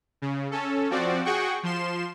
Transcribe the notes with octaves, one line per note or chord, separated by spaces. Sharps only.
C#3
C#4 A4
F3 C4 F#4 D5
F#4 G#4 F#5 G5 C#6
F3 C6 E7